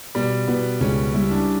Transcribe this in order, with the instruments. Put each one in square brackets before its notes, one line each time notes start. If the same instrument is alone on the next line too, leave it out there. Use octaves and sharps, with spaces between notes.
[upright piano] B2 [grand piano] G3
[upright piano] B2 [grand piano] B3
[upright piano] C#2 [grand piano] C#4
[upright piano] G3 [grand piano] E4
[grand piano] D4